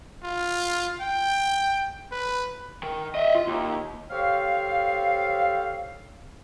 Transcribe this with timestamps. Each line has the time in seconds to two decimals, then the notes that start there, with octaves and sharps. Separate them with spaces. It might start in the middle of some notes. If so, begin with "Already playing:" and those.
0.23 F4
1.01 G5
2.12 B4
2.83 D#3
3.15 D#5 E5
3.35 F4
3.47 D#2
4.10 G4 A4 C5 C#5 F5